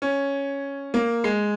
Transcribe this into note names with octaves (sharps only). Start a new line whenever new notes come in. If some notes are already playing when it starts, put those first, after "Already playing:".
C#4
A#3
G#3